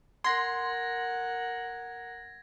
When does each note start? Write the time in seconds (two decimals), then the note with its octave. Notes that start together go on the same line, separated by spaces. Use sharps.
0.24 A#4 F#5 C6 G#6 A#6